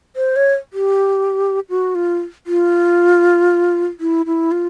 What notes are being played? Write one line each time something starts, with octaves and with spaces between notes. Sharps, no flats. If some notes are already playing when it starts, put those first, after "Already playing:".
C5
C#5
G4
F#4
F4
F4
E4
E4
F4